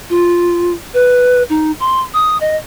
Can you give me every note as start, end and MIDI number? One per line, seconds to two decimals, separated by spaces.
0.10 0.72 65
0.94 1.43 71
1.49 1.72 63
1.80 2.00 84
2.14 2.39 87
2.41 2.57 75